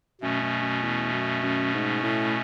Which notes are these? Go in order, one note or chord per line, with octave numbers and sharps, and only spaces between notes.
F#2 B2 A3 C#4
F#2
F#2
E2
F#2
F#2
G#2
A2